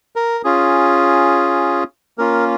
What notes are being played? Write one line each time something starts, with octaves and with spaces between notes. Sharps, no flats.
A#4
C#4 F4 G#4
A#3 C#4 F4 A#4